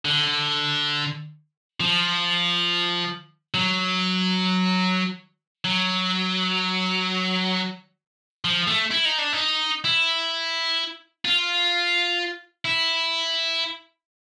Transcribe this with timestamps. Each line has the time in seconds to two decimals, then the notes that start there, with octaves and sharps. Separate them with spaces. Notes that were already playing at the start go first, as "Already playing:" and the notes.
0.05 D3
1.80 F3
3.54 F#3
5.65 F#3
8.45 F3
8.68 A3
8.91 E4
9.05 D#4
9.19 D4
9.33 D#4
9.84 E4
11.25 F4
12.65 E4